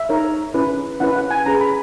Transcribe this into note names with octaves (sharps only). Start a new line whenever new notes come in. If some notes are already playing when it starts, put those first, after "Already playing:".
Already playing: E5
D#4 A#4 C#5
C#4 E4 B4
C#4 E4 B4 F#5
F#5
G#5
C#4 G#4 B4 A#5
B5